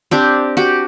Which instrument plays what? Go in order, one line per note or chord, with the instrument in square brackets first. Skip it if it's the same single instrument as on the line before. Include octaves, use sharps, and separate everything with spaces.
[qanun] C4 D4 G4
F#4 G4